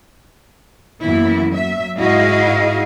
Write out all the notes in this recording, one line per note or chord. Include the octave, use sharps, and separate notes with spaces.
F#2 E3 A#3 B3 E4
F#3 E5
G#2 E4 F#4 G#4 D#5 F5